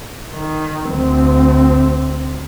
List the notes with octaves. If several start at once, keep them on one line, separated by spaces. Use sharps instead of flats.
D#3
D2 C4